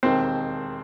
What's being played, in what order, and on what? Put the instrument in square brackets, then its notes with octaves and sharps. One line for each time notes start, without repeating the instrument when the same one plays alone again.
[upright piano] E1 D#2 D#3 C4 C5